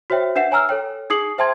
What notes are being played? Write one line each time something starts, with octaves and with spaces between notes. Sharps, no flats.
F#4 C5 C#5 E5 G5
D4 B4 E5 F#5 C7 E7
C#5 G#5 A#5 E6 F6
A4 C#5 G5
D#4 G#4 D#6 C7 F#7
C5 E5 G5 A5 C6 G#6